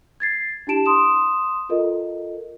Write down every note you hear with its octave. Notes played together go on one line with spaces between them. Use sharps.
G#6 A6 C7
D4 E4 G4 A5 D7 E7
C6 D#6 E7
F4 A4 A#4 D#5